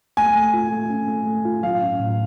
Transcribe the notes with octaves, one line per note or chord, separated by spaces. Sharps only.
A3 G#5
A3
F4
A3
C#4
A3
A3
F4
F#3 F5
C#4
A2